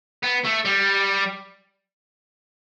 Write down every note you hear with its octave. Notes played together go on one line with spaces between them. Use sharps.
B3
A3
G3